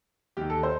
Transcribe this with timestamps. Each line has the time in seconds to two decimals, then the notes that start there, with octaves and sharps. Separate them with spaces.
0.37 D#2 D#3 G4
0.50 A4
0.63 C5